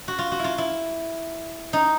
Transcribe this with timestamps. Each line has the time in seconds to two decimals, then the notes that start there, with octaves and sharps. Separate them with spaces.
0.08 F#4
0.19 F4
0.32 F#4
0.39 E4 F4
0.58 E4
1.73 D#4